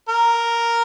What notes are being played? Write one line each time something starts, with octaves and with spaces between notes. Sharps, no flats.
A#4